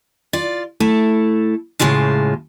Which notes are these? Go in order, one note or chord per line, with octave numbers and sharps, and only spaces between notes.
F4 D5
A3 E4 A4
A2 C#3 G#3 F4 A5